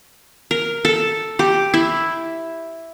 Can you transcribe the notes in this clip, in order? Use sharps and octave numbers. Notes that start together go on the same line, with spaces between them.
A#4
A4
G4
E4